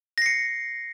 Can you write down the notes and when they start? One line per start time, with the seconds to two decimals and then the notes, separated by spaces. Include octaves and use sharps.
0.18 A#6
0.22 C7
0.26 C#7